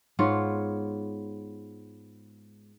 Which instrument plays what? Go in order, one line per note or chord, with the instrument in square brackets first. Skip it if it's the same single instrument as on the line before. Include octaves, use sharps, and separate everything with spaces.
[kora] G#2 B3 F4 C#5